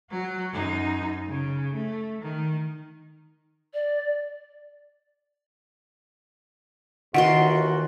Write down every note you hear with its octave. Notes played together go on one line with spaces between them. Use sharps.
F#3 F#4
F#2 D#4
C#3
A3
D#3
D5
D#2 D#3 E3 F4 F#4 F#5 C6